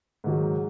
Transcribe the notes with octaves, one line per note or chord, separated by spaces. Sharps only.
G#2 D#3 F#3